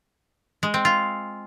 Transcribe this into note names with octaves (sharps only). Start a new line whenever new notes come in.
G#3
C4
F4